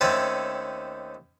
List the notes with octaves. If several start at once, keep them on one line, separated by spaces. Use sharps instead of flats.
D#2 A3 C4 C#4 A4 G#5